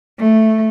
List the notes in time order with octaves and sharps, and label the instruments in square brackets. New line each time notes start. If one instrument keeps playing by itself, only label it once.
[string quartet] A3